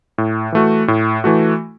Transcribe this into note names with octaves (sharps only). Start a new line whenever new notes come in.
A2
E3 A3 F#4
A2
E3 A3 F#4